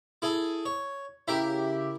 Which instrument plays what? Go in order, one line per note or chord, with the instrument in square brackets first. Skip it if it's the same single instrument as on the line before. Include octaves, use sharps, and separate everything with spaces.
[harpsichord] E4 G#4 A4
C#5
[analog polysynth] C#3 G4 E5 [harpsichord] E4 A#4